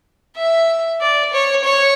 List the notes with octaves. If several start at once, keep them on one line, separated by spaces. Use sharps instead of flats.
E5
D5
C#5
C#5